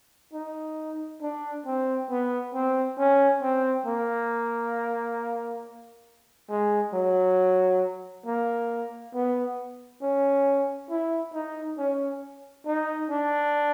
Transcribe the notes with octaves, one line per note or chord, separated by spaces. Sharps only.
D#4
D4
C4
B3
C4
C#4
C4
A#3
G#3
F#3
A#3
B3
C#4
E4
D#4
C#4
D#4
D4